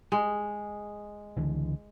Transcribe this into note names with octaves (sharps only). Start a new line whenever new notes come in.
G#3
C#2 D3 E3